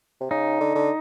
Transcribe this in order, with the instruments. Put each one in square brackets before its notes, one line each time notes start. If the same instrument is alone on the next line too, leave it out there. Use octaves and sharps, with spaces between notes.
[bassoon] C3
[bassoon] C#3 [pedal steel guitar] D#4
[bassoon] D3
D3